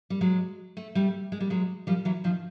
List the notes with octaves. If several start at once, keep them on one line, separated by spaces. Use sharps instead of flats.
G3
F#3 G#3
A3
G3 A3
G#3
G3
F#3 G#3
F3 G3
E3 F#3
D#3 F3